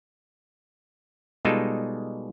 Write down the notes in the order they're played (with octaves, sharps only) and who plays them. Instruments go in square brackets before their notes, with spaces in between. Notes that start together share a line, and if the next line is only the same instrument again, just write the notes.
[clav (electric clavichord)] B2 G3 G#3 D#4 F4 A4